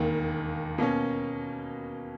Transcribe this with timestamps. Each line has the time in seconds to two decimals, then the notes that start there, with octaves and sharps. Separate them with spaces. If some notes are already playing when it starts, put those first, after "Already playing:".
Already playing: E1 D#2 D#3 A#3
0.78 B2 A#3 C#4